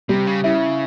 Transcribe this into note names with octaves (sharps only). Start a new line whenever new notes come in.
C3 G3
C#3
C#3 E4